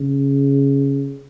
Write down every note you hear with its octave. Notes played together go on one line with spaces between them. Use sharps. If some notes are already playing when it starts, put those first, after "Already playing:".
Already playing: C#3